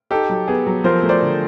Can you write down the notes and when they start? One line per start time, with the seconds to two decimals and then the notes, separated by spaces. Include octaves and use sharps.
0.10 D#4 G4 A4
0.29 F#3
0.48 B3 G#4
0.66 F#3
0.84 F3 A#4 C5
1.03 A3
1.09 C5 D5
1.22 D3